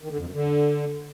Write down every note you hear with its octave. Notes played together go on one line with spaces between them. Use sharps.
D#3
D3
F2
F#2
D3